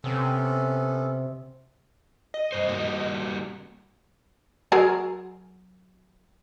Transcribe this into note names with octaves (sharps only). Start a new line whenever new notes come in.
C3 B3 C#4 A4
D#5
G2 C5
G3 A#3 F#4
F#3 G#4 A#4